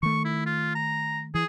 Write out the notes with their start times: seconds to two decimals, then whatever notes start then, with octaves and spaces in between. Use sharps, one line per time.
0.03 D#3 A3 C#6
0.24 E4
0.46 F4
0.75 A#5
1.35 E3 G#4